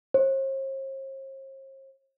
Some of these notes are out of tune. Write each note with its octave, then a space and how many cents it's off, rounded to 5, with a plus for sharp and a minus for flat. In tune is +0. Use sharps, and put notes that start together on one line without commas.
C5 +45